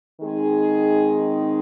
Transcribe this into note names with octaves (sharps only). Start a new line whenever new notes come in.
D#3 G#3 C4 D#4 G#4